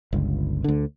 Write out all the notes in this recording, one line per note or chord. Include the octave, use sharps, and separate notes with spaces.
G1 C#2
D2 D3